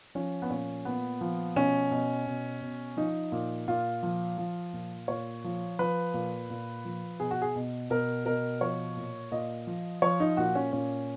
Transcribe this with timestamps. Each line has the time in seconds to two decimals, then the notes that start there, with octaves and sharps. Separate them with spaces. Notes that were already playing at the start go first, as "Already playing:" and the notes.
0.15 F3 C#4
0.42 B3
0.50 A#2 C#4
0.85 A#2 B3
1.21 F3
1.56 B2 C#4
1.91 B2
2.27 B2
2.61 B2
2.97 F3 D#4
3.32 A#2
3.68 A#2 F4
4.03 F3
4.38 F3
4.73 A#2
5.08 A#2 C#5
5.44 F3
5.79 F3 B4
6.14 A#2
6.50 A#2
6.85 F3
7.20 B2 G#4
7.31 F#4
7.42 G#4
7.56 B2
7.90 B2 A#4
8.26 B2 A#4
8.61 F3 C#5
8.97 A#2
9.31 A#2 D#5
9.67 F3
10.02 F3 C#5
10.20 D#4
10.37 A#2 F#4
10.55 C#4
10.72 A#2 C#4